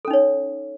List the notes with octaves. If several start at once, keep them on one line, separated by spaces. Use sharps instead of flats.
C#4 D#4 A4 C#5